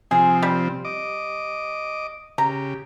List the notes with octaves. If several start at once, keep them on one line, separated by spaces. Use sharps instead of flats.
C3 F3 C4 G#4
G3
D#5 D6
C#3 G4 A#5